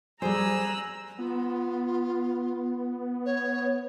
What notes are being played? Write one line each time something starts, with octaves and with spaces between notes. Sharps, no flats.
G3 G#4 C5 G#5 A#5 E6 F#6
B3 F4
C#5